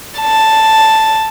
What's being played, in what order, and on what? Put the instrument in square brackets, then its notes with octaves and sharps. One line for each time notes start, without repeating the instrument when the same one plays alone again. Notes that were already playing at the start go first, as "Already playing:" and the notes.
[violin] A5